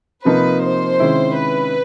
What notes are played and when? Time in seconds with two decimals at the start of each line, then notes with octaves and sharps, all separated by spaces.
0.24 C3 F3 A#3 D#4 B4
0.62 C5
1.00 C3 D#3 G#3 C#4 E4
1.37 B4